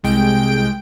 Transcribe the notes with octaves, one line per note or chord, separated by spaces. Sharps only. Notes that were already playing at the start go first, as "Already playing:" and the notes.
C2 G#3 G5 D7